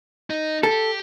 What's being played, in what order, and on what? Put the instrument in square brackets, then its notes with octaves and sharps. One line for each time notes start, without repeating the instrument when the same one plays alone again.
[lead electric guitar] D#4
[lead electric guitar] G4 [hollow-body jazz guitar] A4